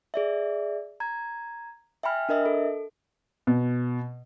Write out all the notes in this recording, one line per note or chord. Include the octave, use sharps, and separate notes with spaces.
G#4 D5 E5
A#5 G#6
E5 G5 G#5 B5 F6
D4 A#4 D#5 E5
A4
B2